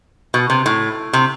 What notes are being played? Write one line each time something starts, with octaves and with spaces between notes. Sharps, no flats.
B2
C3
A2
C3